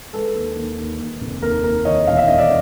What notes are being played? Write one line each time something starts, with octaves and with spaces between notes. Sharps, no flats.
G#3 A4 B4
D#2
D#2
D#2
D#2
F1
D#2 A#4
D#2 A#4
D#3 C#5 D#5
E1 F5
E5
E1 D#5
D5 E5